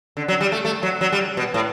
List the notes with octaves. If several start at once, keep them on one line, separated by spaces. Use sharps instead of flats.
D3
F#3
G3
A3
A3
F#3
F#3
G3
B2
A2